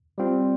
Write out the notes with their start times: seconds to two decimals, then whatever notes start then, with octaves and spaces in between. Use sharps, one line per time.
0.18 G3 C4 F4